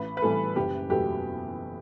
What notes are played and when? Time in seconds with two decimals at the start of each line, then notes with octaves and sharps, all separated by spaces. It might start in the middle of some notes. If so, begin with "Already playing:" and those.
Already playing: A1 B4
0.17 B4
0.22 A2 E3 G3 A4
0.56 F#1 G4
0.89 E2 B2 F#3 A3 G4